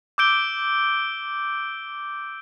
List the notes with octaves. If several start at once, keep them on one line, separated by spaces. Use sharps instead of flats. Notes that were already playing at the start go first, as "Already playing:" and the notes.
D6 E6 G6 D7 G7